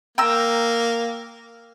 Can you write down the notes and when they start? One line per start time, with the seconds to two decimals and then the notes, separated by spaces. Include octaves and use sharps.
0.18 A#3 G5 A#5 E6